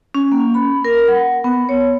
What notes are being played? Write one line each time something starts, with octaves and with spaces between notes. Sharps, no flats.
C#4
A#3
B5
A#4
F#5
B3
C#5